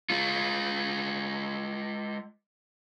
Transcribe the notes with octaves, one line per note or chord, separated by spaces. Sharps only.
G#3 F4